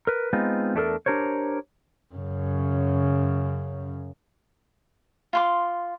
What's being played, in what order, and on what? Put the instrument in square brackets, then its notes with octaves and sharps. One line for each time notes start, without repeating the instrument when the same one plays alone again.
[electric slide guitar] A#4 B4
G#3 B3 C4 D#4 F4
E2 A3 D4 A4 A#4
D4 G4 A#4 C5 C#5
[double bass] F#2 C#3
[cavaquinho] F4 C6 D6